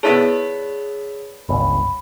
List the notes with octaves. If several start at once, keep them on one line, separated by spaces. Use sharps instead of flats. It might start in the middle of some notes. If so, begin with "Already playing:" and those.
B3 E4 G#4 A4 C#5 D5
G1 C#2 B5